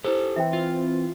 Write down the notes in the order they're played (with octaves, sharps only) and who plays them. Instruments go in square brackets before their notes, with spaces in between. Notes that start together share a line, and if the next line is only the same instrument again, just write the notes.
[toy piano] E4 C5 [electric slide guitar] G4 A4
[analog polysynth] E3 C4 [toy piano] E5 G5
[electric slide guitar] F4